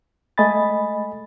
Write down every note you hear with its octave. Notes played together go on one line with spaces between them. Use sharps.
G#3 A3 D#5 G#5 B5 A6